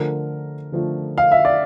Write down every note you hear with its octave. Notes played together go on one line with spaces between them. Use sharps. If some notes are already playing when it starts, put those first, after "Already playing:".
Already playing: D3 F3 A3 A#4
D3 F3 A3
F5
E5
D5